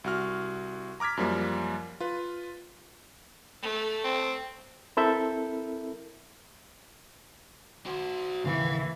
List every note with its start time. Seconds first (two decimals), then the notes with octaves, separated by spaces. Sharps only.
0.04 C2 F#4 F6
1.00 A#5 D6 F6 G#6 B6
1.17 F#2 F3 G3 A#3
2.00 F4 B4
3.62 A3
4.04 C4
4.97 C4 E4 A4 A#4 E5 G6
7.86 F#4 C5
8.45 D#2 A2 C#3 E3 E5 F5